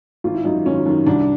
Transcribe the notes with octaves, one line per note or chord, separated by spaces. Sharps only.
G#1 F4
E4
F#2 D#3 D#4
G#1 C#4
F#2 D#3
C2 D4